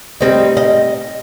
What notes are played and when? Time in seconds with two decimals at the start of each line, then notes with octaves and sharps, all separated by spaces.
0.20 G3 C4 D#4
0.57 D#5